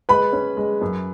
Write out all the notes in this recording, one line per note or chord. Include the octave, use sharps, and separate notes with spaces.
G#3 B4 B5
C#4
G#3
F#2